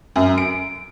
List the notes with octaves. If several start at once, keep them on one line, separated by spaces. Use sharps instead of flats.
F#2
D7